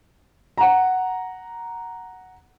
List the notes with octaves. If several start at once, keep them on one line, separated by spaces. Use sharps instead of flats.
F#5 A#5